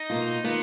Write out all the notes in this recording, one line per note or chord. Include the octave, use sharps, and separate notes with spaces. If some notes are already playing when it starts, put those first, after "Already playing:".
Already playing: D#4
B2 A#3 F4
D#3 A#3 B3 F4